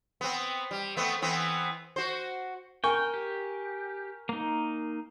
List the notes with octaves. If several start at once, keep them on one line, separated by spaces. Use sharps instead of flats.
B3 C4
G3
A3 B3 C4
E3 B3 C4
F#4 C5
A#4 G5 G#5 C#6
G4
A#3 D#4